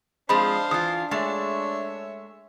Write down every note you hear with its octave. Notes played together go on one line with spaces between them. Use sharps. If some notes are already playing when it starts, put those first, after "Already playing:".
F3 G#3 C4 D4 C5 F5 B5
E3 F4 D#6
G#3 A3 D4 C#5 E5